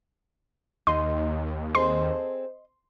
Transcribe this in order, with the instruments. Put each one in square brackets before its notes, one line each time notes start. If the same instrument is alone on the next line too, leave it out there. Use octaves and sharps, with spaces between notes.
[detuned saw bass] D#2 [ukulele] D#4 D#5 [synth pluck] C6
[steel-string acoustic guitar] C4 G#4 A4 [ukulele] D#5 [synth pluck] C6